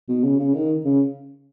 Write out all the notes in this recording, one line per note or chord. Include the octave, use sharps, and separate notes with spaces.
B2
C#3
C#3
D#3
C#3